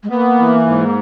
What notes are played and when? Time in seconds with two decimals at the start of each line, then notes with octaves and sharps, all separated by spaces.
0.03 G#3
0.10 A#3 B3
0.39 E3
0.66 G#2